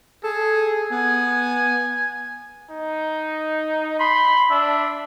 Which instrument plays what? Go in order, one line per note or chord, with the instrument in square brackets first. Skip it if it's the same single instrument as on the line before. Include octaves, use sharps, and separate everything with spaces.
[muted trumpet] G#4 [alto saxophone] A4
[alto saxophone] B3 [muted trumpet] G#5
[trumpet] D#4
[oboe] B5 [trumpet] C6
[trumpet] D4 [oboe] E5